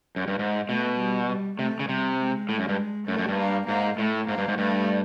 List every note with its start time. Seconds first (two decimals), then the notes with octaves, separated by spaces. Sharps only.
0.16 F#2
0.28 G2
0.39 G#2
0.69 B2 A3
1.00 G3
1.29 G3
1.59 C3 A3
1.80 C#3
1.89 C3 G3
2.19 G#3
2.49 A2
2.59 F#2
2.69 G2
3.08 F#2 A3
3.18 F#2
3.28 G2
3.39 A#3
3.68 G#2 A#3
3.98 A2 A3
4.28 G#2 A#3
4.38 G2
4.48 G#2
4.58 G2 A3